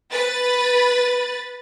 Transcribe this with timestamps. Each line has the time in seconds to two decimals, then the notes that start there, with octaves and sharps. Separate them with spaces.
0.12 B4 A6